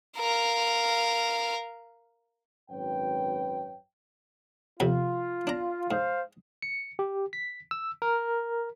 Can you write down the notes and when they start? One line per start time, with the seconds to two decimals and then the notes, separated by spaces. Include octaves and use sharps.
0.18 A#4 F5
2.70 G#1 F#2 B4 C#5 G5
4.80 F2 C3 F4 B5
5.47 D4 A#5
5.91 G#2 C5 F5
6.62 C#7
6.99 G4
7.33 B6
7.71 E6
8.02 A#4